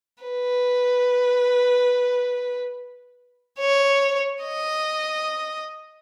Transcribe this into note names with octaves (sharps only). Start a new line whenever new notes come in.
B4
C#5
D#5